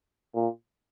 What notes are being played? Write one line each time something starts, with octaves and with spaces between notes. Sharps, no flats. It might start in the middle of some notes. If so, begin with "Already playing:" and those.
A#2